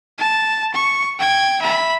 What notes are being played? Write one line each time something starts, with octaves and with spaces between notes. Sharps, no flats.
A5
C#6
G5 G#6
E5 B5